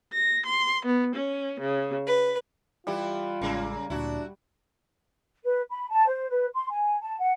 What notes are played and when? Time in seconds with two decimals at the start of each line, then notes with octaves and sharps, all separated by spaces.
0.12 A#6
0.46 C6
0.85 B3
1.15 C#4
1.60 C#3
2.06 B4
2.87 E3 G3 E4 F4
3.41 A1 C#3 G#3 A#3 E6
3.90 D2 A#2 D4 E4 F#4
5.44 B4
5.70 B5
5.90 A5
6.06 C5
6.29 B4
6.53 C6
6.70 G#5
7.00 A5
7.19 F#5